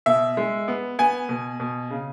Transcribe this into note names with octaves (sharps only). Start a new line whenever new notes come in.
B2 E5
G#3
B3
B3 G#5
B2
B2
C#3